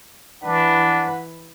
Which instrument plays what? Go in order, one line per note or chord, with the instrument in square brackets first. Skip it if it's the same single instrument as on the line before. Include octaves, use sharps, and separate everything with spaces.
[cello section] E3 B4 [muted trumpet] D4 [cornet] F#5